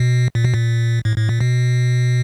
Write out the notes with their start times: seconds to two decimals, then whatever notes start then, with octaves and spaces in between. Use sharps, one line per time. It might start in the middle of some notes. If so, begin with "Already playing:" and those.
Already playing: B2
0.35 A#2
0.45 B2
0.54 A#2
1.05 A2
1.18 A2
1.29 A#2
1.40 B2